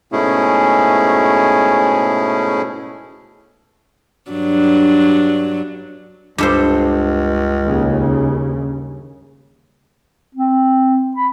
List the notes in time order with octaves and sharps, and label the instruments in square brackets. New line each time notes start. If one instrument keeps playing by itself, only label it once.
[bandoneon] G#2 B2 A3 C#4 E4 G#4
[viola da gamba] G2 F#3 D4
[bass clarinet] C#2 [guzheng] G2 A4 C5
[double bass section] D#2 C#3
[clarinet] C4
B5